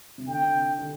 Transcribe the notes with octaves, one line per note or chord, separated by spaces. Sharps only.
C3
D3 G5
D3